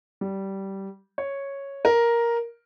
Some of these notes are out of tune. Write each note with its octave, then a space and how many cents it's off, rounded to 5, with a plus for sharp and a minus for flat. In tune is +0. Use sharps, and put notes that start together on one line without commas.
G3 -15
C#5 -5
A#4 +5